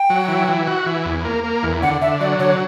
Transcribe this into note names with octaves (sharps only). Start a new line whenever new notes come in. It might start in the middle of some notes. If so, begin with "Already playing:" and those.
Already playing: G5
F#3
E3
E3
F#4
E3
E2
A#3
A#3
E2
D3 F#5
D3 E5
F#3 D5
D3 C#5